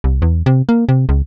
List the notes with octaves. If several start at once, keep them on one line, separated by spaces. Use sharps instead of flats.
C2
E2
C3
A#3
C3
C#2